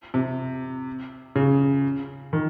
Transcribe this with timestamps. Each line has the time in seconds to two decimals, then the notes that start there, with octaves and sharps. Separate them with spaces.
0.14 C3
1.36 C#3
2.33 D#3